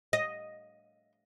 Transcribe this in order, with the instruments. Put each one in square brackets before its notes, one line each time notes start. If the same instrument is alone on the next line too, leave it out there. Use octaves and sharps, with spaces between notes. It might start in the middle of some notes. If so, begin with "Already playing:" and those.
[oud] D#5